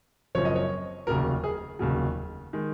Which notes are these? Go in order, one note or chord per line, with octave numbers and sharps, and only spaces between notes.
F#1 F#2 F3 C4 C#5
D#5
C#5
F1 D#2 C#3 F#3 A#4
G#4
F1 D#2 C#3 F#3
D#3 G#3